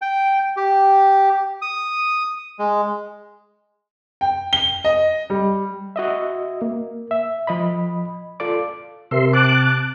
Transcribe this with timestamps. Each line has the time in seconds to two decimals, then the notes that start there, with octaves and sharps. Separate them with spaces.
0.02 G5
0.57 G4
1.62 D#6
2.59 G#3
4.21 G5
4.53 G7
4.84 D#5
5.30 G3
5.96 F#4 D#5 E5
6.62 A#3
7.11 E5
7.47 F3 D#5 B5
8.40 F4 A4 D5 D6
9.11 C3 A#4 E5 C6
9.33 A5 D6 F#6